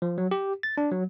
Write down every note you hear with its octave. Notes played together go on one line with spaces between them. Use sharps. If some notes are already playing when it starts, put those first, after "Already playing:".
F3
F#3
G4
A6
D4
F#3